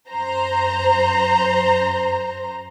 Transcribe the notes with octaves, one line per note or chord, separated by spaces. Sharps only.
F#2 C5 A#5